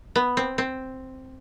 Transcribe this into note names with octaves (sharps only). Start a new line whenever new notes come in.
B3
C4
C4